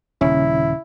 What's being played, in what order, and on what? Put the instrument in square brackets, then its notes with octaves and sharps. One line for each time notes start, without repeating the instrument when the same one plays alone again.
[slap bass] D#1 [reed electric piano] C#3 C#4 [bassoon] E4